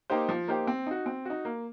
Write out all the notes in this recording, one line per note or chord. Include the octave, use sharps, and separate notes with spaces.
A#3 D#4 G4 C5
F3
A#3 D#4 G4 C5
C4
D#4 F#4
C4
D#4 F#4
A#3